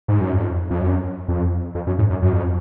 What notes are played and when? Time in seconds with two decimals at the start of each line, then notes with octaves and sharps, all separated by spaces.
0.08 G#2
0.21 F#2
0.34 F2
0.70 F2
0.81 F#2
1.28 F2
1.75 F2
1.87 F#2
1.98 G#2
2.10 F#2
2.22 F#2
2.32 F2